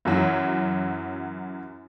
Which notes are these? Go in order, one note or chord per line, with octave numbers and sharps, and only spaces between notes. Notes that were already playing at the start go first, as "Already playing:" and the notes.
F#2 E3 F#3